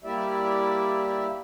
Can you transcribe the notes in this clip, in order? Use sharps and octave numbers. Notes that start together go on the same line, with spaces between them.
G3 A#3 E4 G4 D5 E5